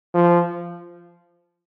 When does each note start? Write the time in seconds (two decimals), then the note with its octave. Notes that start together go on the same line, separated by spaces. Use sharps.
0.14 F3